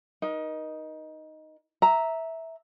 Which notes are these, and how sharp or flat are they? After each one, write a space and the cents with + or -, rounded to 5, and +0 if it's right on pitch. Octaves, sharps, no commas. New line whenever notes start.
D#4 +0 A#4 +35
E5 -10 A#5 +0